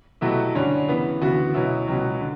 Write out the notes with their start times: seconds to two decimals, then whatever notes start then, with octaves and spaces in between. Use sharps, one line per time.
0.21 B2 F#3 A3 E4 G4
0.55 G2 D3 G3 C#4
0.88 C#3 E3 B3
1.21 D2 C#3 E3 B3 F#4
1.54 B2 F#3 C#4 E4
1.88 C#2 B2 F#3 C#4
2.20 D3